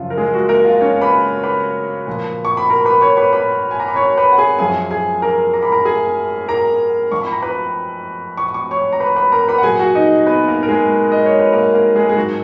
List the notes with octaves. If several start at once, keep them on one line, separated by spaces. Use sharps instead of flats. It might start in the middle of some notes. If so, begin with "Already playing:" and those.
Already playing: F#2 C#3 F3 F4
A#4
G#3 G#4
F#4
A#3 A#4
F4 F5
C#4 C#5
B4 B5
B4 B5
A#2 F3
C#6
B5
A#4 A#5
B4 B5
C#5 C#6
B4 B5
B4 B5
G#5
A#5
B5
C#5 C#6
B4 B5
F#5
G#4 G#5
F#2 F3 G#4 G#5
G#4 G#5
A#4 A#5
A#5
B5
A#4 A#5
G#4 G#5
A#4 A#5
F2 F3 C#6
B5
A#5
B4 B5
C#6
C#6
C#5 C#6
A#5
B4 B5
B4 B5
A#4 A#5
B4 B5
F#5
A#2 F#3 G#4 G#5
F#4 F#5
D#4 D#5
B3 B4
A#3 A#4
A#4
G#3 G#4
D#5
C#5
B4
A#3 A#4
A#3 A#4
G#3 G#4
G#4
G#2 D#3 F#3 F#4